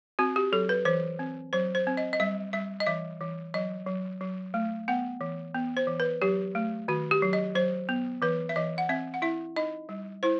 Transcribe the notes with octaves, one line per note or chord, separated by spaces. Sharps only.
C4 F#4
G4
F#3 A4
B4
E3 C5
C4
F#3 C5
C5
C4
D#5
D#5
G3 E5
G3 E5
D#5
E3 E5
E3
F#3 D#5
F#3
F#3
A3
B3 F#5
E3
B3
C5
E3
B4
F#3 G4
A3
D#3 F#4
G4
F#3
D#5
F#3 C5
B3
E3 B4
E5
E3 D#5
F#5
C4 E5
F#5
E4 E5
D#4 D#5
G3
E4 C5